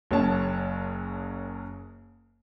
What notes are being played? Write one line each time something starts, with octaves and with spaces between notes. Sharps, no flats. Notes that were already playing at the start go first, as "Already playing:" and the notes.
F#1 F#2 C#4 A5